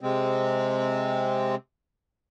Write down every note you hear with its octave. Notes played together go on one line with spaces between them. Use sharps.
C3 G#3 C4